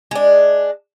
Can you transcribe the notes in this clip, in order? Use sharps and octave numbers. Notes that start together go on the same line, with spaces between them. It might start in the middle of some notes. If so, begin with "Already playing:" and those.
G#3 D4